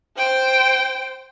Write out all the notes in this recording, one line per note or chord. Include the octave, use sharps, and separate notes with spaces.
C5 G5